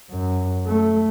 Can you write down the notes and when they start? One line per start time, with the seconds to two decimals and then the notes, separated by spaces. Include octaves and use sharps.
0.11 F#2
0.67 A3